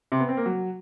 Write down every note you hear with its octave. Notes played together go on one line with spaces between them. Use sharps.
C3
B3
C4
A#3
F#3